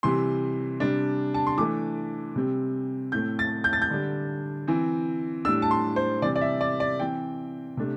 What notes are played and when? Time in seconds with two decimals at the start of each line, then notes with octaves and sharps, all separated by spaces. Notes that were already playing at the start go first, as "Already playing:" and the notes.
0.03 C3 E3 G3 C4 C6
0.80 C3 G3 D4
1.34 A5
1.47 C6
1.57 E3 A3 D4 D6
2.36 C3 G3 C4
3.12 A2 A3 C4 G6
3.39 A6
3.64 G6
3.73 A6
3.82 G6
3.90 D3 G3 D4
4.68 E3 C4
5.45 A2 G3 D4 E6
5.62 A5
5.71 C6
5.96 C5
6.22 C3 E3 G3 C4 D5
6.36 D5
6.41 E5
6.61 D5
6.80 D5
7.00 E3 C4 G5
7.77 C3 A3 D4